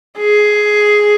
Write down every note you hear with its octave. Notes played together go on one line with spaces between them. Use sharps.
G#4